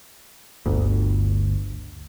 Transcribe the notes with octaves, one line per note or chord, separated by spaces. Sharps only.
G1 D2